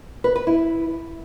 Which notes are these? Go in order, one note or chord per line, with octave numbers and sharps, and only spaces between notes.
B4
B4
E4